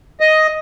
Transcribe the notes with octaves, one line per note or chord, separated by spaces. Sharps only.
D#5